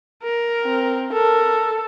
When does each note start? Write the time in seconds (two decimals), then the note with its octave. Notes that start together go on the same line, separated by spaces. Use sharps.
0.23 A#4
0.65 C4
1.13 A4 A#4